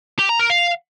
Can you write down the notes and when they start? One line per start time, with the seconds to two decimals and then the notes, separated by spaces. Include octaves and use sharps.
0.19 G4
0.29 A#5
0.39 A#4
0.50 F5